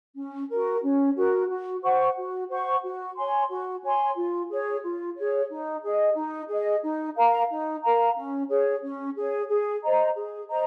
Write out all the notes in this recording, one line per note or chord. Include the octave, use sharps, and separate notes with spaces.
C#4
F#4 A#4
C#4
F#4 A#4
F#4
C5 F#5 C#6
F#4
C5 F#5 C#6
F#4
C#5 G#5 C6
F#4
C#5 G#5 C6
F4
G#4 C#5
F4
G#4 C#5
D#4
G#4 D#5
D#4
G#4 D#5
D#4
A#4 F5 A#5
D#4
A#4 F5 A#5
C#4
G#4 C#5
C#4
G#4 C#5
G#4
C5 D#5 A#5
G#4
C5 D#5 A#5